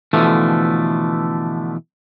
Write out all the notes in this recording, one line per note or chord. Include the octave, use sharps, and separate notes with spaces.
B2 D3 E3 F3 A3